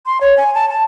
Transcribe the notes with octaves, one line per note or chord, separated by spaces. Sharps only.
C6
C#5
G#5
A5
A5